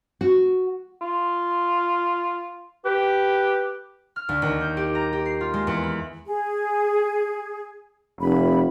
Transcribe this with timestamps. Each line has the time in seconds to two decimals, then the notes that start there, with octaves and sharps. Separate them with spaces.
0.21 F#4
1.01 F4
2.85 G4 B4
4.16 F6
4.29 D2
4.42 D#2
4.61 G6
4.77 G4
4.95 A#5
5.13 G4
5.25 C7
5.41 F4
5.54 G#3
5.67 E2
5.83 B5
6.26 G#4
8.21 F1 B5